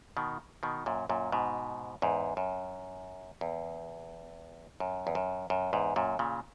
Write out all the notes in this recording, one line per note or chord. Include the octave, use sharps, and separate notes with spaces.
B2 D#3
B2 D#3
F#2 A#2
F#2 A#2
G#2 B2
E2 G#2
F#2
E2
F#2
E2
F#2
F#2
E2 G#2
F#2 A#2
A#2 C#3